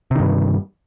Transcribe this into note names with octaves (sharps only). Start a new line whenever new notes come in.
G2 C3 D#3